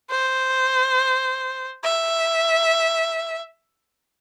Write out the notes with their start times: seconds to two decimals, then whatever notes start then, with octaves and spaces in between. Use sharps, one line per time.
0.11 C5
1.84 E5